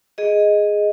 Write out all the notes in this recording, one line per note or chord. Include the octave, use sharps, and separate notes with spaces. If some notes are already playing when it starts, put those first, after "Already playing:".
G#4 D#5